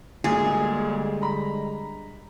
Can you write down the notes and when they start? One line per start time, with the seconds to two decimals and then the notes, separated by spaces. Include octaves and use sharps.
0.24 D2 A#2 D3 G3 G#3 G#4
1.22 A#5 B5